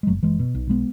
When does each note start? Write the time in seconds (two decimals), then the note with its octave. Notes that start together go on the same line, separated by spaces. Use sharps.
0.03 G#3
0.07 F#1 F#3 A3
0.23 F#1 E3 G#3
0.39 B2
0.55 B1
0.70 G#3 B3